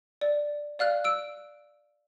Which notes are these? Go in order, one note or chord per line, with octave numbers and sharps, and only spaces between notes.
D5
D5 F5 F6 F#6
E6 D7